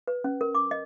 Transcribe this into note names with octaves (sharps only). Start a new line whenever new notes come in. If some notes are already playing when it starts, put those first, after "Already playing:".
B4
C#4
A#4
D6
D#5